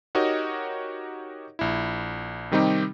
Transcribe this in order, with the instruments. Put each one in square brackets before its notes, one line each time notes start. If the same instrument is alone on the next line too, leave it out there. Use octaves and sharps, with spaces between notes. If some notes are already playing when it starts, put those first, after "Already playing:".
[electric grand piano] D#4 F#4 G4 A#4 C#5 D#5
A#1 E4
C3 D#3 G3 C4 D#4 G4